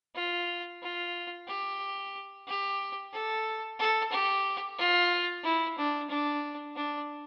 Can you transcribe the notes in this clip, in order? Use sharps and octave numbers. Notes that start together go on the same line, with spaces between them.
F4
F4
G4
G4
A4
A4
G4
F4
E4
D4
D4
D4